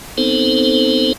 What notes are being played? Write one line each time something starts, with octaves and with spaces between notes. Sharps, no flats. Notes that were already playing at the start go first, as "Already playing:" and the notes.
B3 C4 D#4 A4 C5